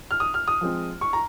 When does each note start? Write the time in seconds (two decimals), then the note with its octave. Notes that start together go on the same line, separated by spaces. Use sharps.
0.11 F6
0.20 D#6
0.34 F6
0.48 D#6
0.61 F3 G#3 C4
1.01 C#6
1.13 A#5